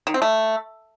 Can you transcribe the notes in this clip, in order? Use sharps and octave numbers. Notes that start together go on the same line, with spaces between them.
D#3
C4
A3